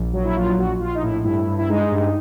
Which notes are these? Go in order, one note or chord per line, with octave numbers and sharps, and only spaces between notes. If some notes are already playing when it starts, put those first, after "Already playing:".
Already playing: A#1
F#3
E4
A#1 F4
A#1 F#4
A#1 F4
D#4
A2 E4
G2 E4
G2
E4
G#3 D#4
G2